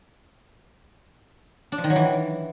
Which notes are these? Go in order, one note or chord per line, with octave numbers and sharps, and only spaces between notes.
D4
F3
D#3
F#3
E3